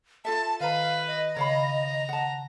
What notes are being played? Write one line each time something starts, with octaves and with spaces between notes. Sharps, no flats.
F4 A4 E5 A5
D#3 B4 F5 A#5
D#5
C#3 C#5 F5 A#5 B5
F#5 A5